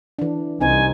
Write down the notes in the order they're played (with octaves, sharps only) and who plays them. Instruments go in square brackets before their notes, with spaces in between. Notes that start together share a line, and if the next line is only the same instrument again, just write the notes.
[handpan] E3 D4
[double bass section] C2 [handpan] C4 D#4 C5 [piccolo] G#5